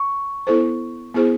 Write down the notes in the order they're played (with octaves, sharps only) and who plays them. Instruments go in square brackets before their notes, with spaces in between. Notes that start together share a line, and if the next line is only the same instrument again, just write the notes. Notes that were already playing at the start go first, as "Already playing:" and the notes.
Already playing: [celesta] C#6
[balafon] B3 E4 A4 C5
B3 E4 G#4 C5